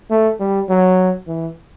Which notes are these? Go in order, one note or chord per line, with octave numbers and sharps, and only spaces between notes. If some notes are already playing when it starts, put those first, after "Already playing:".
A3
G3
F#3
E3